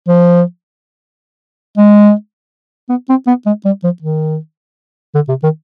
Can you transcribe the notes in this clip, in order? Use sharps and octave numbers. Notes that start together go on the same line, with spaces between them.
F3
G#3
B3
C4
B3
G#3
G3
F3
D#3
D3
C3
D#3